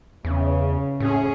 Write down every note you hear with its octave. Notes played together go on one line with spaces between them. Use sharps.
E2 C#3
A2 C#4 G#4